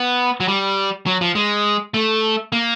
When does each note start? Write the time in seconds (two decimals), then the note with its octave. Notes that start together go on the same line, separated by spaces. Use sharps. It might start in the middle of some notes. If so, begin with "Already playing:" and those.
Already playing: B3
0.40 F#3
0.48 G3
1.06 F#3
1.21 F3
1.35 G#3
1.94 A3
2.52 A#3